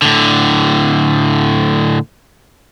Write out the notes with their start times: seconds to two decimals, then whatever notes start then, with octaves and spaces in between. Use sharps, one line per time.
0.02 A2 D3